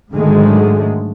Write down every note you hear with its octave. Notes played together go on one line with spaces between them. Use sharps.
G#2 D3 D#3 F#3 G#3 A3